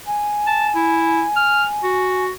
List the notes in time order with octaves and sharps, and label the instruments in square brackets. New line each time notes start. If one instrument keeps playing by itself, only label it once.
[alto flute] G#5
[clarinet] A5
E4
F6
F#4